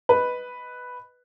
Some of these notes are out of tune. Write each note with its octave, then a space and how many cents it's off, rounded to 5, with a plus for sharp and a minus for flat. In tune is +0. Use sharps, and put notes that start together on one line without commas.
B4 +0 D#5 +0